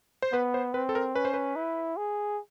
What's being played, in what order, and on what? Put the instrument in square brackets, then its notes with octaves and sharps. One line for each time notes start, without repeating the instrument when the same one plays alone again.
[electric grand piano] C5
[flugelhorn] B3 [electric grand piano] B4
[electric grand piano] C5
[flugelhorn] C4 [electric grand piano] B4
[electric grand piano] A4
A#4
[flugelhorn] C#4 [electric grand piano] B4
[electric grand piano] C5
B4
[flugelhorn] E4
G#4